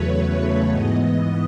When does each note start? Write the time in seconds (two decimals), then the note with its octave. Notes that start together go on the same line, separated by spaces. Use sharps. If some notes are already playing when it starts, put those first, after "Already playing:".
Already playing: E2 C#3 F#3 A3 B4 C#5
0.18 C#5
0.70 G#2 E3 B3 D#5